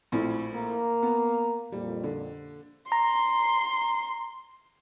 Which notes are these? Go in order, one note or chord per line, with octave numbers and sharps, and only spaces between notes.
A#1 A2 C4
A#3 A#5
B3
F2 A#2 G3
D3
A#5 C6